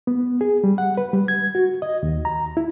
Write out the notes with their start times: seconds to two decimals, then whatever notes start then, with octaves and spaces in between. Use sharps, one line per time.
0.07 B3
0.41 G#4
0.64 G3
0.78 F#5
0.97 B4
1.13 G3
1.28 G#6
1.55 F#4
1.82 D#5
2.03 D#2
2.25 A#5
2.57 E4